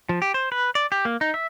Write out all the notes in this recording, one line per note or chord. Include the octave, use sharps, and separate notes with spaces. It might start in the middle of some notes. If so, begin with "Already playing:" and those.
F3
G4
C5
B4
D5
G4
A#3
D#4
E5